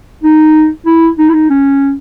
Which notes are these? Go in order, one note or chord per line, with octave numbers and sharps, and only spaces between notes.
D#4
E4
D#4
E4
D#4
C#4